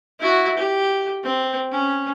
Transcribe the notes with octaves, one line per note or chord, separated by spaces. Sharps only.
E4 F#4
G4
C4
C#4